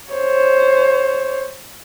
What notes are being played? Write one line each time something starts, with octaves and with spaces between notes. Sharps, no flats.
C5 C#5